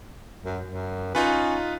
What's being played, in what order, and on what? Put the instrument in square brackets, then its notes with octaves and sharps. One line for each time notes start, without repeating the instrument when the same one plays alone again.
[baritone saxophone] F#2
F#2
[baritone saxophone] C#4 [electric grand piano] D#4 F4 B4